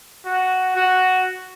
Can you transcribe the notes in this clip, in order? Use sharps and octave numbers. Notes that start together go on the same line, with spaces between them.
F#4
F#4